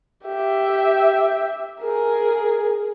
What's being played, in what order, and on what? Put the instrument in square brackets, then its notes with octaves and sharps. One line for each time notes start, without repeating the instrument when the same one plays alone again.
[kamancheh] G4 E5
G#4 A#4